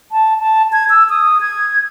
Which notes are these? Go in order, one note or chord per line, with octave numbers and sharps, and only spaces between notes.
A5
A5
G#6
E6
D#6
G#6